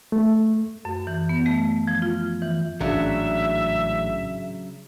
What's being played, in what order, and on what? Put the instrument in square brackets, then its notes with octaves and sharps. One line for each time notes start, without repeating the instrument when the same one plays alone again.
[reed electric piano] A3
[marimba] F#2
E3
B3
A3
F3
F4
E3
[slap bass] A1 G#2 [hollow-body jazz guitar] C#3 F#3 D4 [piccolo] E5